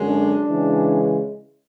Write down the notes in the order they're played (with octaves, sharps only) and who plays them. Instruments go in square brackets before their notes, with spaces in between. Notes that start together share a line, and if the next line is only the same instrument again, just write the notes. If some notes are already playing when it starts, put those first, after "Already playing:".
Already playing: [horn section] F#2 D3 G#3
D4
C#3 E3 G#3